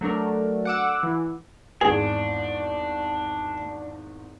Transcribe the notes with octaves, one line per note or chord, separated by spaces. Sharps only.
F#3 A3 D4 A#4
F#5 D6 E6
E3
G#1 E2 G#2 D4 G#4